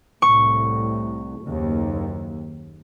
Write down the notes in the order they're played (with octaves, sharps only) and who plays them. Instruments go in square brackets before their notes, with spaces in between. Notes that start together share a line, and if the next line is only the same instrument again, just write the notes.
[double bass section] C2 A2 [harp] C#6
[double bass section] F#1 D#2